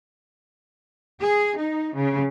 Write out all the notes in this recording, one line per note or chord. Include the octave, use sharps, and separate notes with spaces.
G#4
D#4
C#3